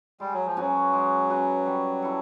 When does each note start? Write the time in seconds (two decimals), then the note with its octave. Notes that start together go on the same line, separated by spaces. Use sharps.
0.20 G3 G#3
0.34 F#3
0.46 F3
0.57 F#3 C#4 F#4 B4
0.93 G#3
1.30 C#4 F#4 B4
1.66 G3
2.02 E4 A4